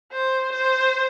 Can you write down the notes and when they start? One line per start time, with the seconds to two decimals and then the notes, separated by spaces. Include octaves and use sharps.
0.12 C5
0.53 C5